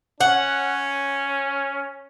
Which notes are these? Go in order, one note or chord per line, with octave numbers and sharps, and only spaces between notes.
C#4 F#5